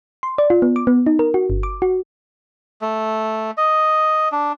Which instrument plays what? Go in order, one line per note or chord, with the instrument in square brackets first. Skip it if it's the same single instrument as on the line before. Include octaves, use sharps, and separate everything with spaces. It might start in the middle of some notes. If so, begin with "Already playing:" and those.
[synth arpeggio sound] C6
D5
F4
B3
D6
B3
D#4
A#4
F#4
G1
D6
F#4
[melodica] A3
D#5
D4